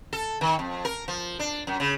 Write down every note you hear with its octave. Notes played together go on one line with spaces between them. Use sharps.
A4
D#3
F2
A#4
F3
D4
F#2
C#3